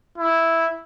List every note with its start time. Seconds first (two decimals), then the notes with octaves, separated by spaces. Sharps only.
0.18 E4